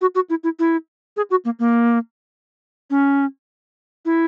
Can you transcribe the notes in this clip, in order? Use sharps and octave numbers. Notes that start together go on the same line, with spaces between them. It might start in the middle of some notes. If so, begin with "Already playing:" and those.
F#4
F#4
E4
E4
E4
G#4
F#4
A#3
A#3
C#4
E4